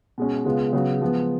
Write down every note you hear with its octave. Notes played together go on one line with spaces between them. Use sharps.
B2 G#3 C#4
C#3 G#3 B3 F4
C#3 F#3 B3 F#4
F3 G#3 B3